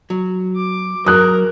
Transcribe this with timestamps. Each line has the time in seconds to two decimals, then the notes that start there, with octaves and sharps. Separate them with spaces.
0.10 F#3
0.56 D6
1.06 F#3 A#4 D#6 F#6